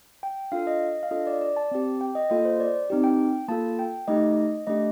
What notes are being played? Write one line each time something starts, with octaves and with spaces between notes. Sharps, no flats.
G5
D4 F4 A4 F5
D#5
F5
D4 F4 A4 D#5
D5
D5
A5
C4 G4
G5
D#5
A#3 F4 A4 D#5
C5
D5
C4 D#4 G4
G5
A#3 F4 A4 A5
G5
A3 D#4 G4 D#5
A3 D4 G4 D#5